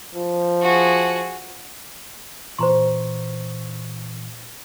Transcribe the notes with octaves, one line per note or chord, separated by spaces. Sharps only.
F3
F#4 G#4
A#2 E3 C5 A#5 C6 C#6